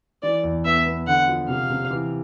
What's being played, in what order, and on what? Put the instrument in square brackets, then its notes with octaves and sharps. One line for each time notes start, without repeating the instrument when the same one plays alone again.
[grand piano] E3 [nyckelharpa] D5
[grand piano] E2
[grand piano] B3 [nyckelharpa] E5
[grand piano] B3
[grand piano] D3 [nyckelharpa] F#5
[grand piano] F3
[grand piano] C3 [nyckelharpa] F5
[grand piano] C3
E3